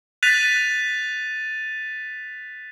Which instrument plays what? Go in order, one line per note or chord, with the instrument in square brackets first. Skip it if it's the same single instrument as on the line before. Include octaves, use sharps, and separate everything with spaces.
[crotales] F#6 A6 B6 D#7 F7